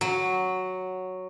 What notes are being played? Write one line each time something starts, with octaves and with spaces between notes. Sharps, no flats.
F#3